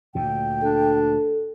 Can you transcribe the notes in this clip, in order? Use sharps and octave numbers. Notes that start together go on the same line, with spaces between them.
D2 A#2 G5
D4 A4